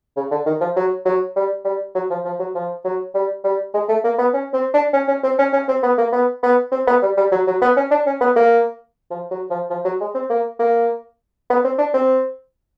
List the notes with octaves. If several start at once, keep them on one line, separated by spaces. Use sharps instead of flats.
C#3
D3
D#3
F3
F#3
F#3
G3
G3
F#3
F3
F3
F#3
F3
F#3
G3
G3
G#3
A3
A#3
B3
C#4
C4
D4
C#4
C#4
C4
C#4
C#4
C4
B3
A#3
B3
B3
C4
B3
G3
G3
F#3
F#3
B3
C#4
D4
C#4
B3
A#3
F3
F#3
F3
F3
F#3
G#3
C4
A#3
A#3
B3
C4
D4
C4